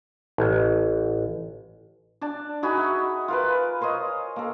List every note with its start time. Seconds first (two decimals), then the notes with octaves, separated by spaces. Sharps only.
0.38 A1
2.21 D4 D5 A5
2.63 D#4 F#4 G#4 B5
2.77 E5
3.28 F4 A#4 B4
3.81 A#4 C5 C#5 D#5
4.36 A#3 A4